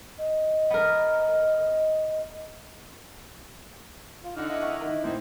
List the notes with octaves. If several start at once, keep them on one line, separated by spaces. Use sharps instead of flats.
D#5
B3 A#4
F4
D3 D#4 F#5 F6
E4 D#5
E5 C#6
D#3 A#4
A2 E3 C4 D#4 C5